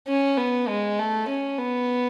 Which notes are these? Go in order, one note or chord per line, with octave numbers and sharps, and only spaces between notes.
C#4
B3
G#3
A3
C#4
B3